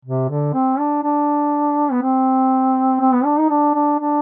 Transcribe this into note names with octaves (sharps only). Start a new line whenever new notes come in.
C3
D3
C4
D4
D4
B3
C4
C4
B3
D4
D#4
D4
D4
D4